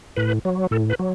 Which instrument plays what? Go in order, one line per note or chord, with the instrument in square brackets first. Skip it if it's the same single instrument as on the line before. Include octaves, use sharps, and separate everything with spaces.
[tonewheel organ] A2 B4
F#3
A2 A4
B4
F#3